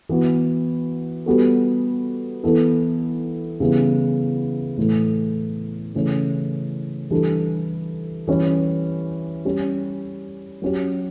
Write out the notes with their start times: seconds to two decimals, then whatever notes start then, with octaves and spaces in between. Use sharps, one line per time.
0.09 E3 B3 F#4
1.26 G3 B3 F#4 A4
2.43 E3 B3 E4 A4
3.60 C#3 E3 G3 B3 E4
4.77 A2 E3 A3
5.94 C#3 E3 A3 C#4 E4
7.11 E3 G3 D4 A4
8.27 E3 G3 C#4 E4 G4
9.45 G3 C#4 G4
10.62 F#3 C#4 G4